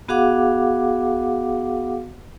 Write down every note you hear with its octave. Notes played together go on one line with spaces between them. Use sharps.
B3 F#4 G#4 F5 F#5 D6